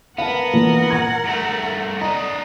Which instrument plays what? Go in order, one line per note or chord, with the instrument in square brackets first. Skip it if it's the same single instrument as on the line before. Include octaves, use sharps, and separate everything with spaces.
[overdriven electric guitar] B3 [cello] A#4 F#5 [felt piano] F5 A5
[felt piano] A#2 E3
G#6
[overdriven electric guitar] G2 A3
[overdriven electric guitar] D4 D#5 [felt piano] A#5